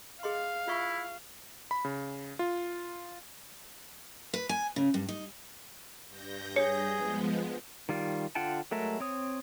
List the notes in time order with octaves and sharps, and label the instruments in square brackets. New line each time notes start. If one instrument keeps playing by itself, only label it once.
[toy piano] G#4 D#5 C6 [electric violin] F5
[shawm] E4 [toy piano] F4 E5 C#6
[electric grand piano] B5
C#3
F4
[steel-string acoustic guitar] B4
G#5
C#3
G2
D#4
[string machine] G2 G6 A#6
[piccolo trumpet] G#4 [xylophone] C#5 C#7
[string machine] F3 G#3 B3
[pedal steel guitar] D#3 G3 F4
D3 F4 F#5 G5 A5
F#3 G#3 A3 A#4 E5
C4 C#5 D#6